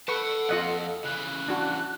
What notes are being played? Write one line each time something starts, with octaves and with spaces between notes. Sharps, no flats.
A4 B4 F#5 A5 C#6
F2 F4 D#5 F#5
C#3 E3 F#6
D4 F#4